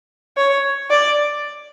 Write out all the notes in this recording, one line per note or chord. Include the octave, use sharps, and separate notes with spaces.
C#5
D5